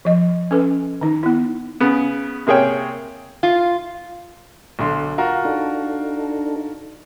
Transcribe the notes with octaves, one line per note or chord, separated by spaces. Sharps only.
F3 D#5
C#4 A4 B4
D#3 D#4
B3 E4
C#3 B3
C3 A#3 G#4 C#5 G5
F4
B1 D3 C6
F4 F#4 A#4
D4 D#4 A4